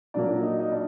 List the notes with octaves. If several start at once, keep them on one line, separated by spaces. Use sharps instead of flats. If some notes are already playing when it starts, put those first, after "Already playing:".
A#2 F#3 A#3 D4
D#4
D#4
D4